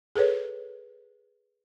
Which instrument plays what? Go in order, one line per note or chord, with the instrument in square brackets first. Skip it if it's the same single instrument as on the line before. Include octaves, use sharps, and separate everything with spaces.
[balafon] G#4 A4 B4 C#5